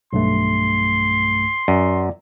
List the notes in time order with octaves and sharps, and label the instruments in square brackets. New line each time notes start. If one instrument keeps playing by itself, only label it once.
[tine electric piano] B1 G2 A3 [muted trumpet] C6
[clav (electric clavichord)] F#2 [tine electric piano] D5